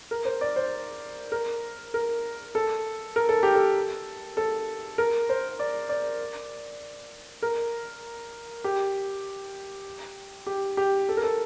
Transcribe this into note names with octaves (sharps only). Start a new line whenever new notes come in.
A#4
C5
D5
C5
A#4
A#4
A4
A#4
A4
G4
A4
A4
A#4
C5
D5
D5
A#4
G4
G4
G4
A4
A#4
A4